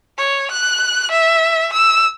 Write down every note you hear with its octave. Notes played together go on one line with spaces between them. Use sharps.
C#5
F#6
E5
E6